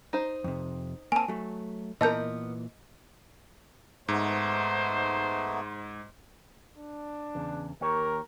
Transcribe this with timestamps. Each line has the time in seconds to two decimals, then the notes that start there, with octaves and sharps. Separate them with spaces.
0.13 D#4 C5
0.44 F2 C3
1.12 A#3 C4 G#5 A5
1.28 F#3 A3
2.01 A#2 E3 B3 A#4 D#5 A5 G6
4.08 G#2 A3 B3 D#4 C5
6.76 D4
7.35 E2 C#3
7.81 D#2 G4 A#4 C#5